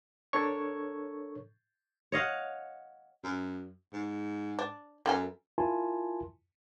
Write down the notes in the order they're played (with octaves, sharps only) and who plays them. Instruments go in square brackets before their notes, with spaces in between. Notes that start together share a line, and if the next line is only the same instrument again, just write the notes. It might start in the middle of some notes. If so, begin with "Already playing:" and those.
[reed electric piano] D4 A4 A#4 C#5 C#6
[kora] C#5 D#5 F5 F#5
[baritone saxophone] F#2
G#2
[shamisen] D4
[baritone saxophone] F#2 [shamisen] A#3 A4 G#5
[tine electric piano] E4 F4 A#4 G#5 A5 C6